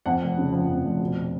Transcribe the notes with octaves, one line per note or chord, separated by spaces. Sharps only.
F2 F#5
F1
C#3
F3
F2
F1
B2